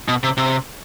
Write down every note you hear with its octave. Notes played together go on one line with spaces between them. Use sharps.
B2
C3
C3